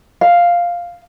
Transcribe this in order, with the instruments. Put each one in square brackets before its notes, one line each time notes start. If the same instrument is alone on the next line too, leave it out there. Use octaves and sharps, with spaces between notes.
[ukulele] F5